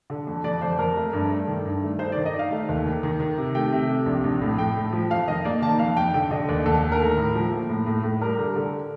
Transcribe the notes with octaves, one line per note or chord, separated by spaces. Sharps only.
D3
F2
F2 D5
F2 C5
F2 A#4
A3
G2
A3
D#3
G2
A3
D#4 C5
D5
D#3
D#5
D#4 F5
A3
D#2
D#3
D#3
D#3
C3
A3 G5
C3
C3
A#1
A#1
A2
A2 G5
A2
F3
F2 F5
D#3 D#5
A#3 D5
D#3 A5
F2 F5
F2 G5
D3 G5
D3 D#5
D#2 D5
D#2 A4
D3
A#4
A3
A2
F3
A#3
A2
A2
A2
G3 A#4
D3
D3